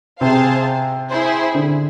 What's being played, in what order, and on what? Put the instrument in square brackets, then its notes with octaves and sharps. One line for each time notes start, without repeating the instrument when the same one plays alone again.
[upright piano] C3 [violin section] G#4 C5 F5 A5
[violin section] E4 G#4 C5
[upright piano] D3